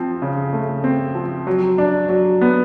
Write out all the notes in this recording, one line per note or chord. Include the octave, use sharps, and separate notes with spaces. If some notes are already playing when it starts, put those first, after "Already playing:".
Already playing: F3 C4
C#3
A3
C4
F3
F#3
D4
F#3
B3